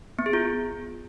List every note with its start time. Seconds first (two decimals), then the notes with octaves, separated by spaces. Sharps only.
0.19 B3
0.26 G#4
0.33 F4